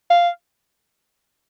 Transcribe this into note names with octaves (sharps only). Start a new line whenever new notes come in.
F5